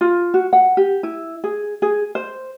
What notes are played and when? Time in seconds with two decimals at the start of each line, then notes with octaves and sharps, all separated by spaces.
0.01 F4
0.34 F#4
0.53 F#5
0.77 G4
1.03 E4
1.44 G#4
1.82 G#4
2.15 C5